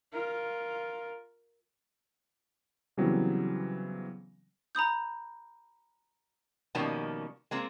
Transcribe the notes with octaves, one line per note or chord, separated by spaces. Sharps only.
F4 A#4
C#3 E3 F#3 G3 B3 C4
A#5 B5 D#6 G6
B2 D#3 F3 G3 A#3 C#4
G#3 A#3 C4 F4